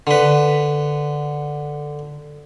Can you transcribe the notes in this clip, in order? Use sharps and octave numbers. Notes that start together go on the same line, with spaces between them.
D3 B4